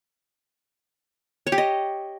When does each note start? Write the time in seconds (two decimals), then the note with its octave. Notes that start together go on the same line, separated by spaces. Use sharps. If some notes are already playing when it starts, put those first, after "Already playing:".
1.47 C#5
1.52 G4
1.58 D#5